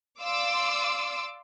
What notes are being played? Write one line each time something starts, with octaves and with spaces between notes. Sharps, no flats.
D5 F5 C6 D6 E6